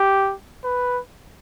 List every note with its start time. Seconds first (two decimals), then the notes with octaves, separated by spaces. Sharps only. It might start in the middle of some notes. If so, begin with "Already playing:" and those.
Already playing: G4
0.64 B4